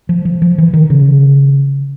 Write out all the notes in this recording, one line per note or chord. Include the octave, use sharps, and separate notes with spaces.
F3
F3
F3
E3
D#3
C#3